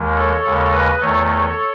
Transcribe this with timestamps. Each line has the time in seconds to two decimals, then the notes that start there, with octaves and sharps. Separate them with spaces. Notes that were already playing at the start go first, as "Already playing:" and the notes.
Already playing: D#2 D#3 G#3
0.15 A4 C#5
0.43 D#2 C#3 G#3
0.72 B4 D#5
1.00 E2 D#3 A3 A4 C#5
1.29 A4 C#5